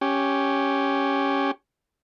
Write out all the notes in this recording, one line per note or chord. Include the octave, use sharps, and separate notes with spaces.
C#4 G4